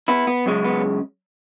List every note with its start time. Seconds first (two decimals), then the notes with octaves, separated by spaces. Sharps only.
0.08 B3 E4
0.27 B3
0.46 F#2 C#3 G#3
0.65 B3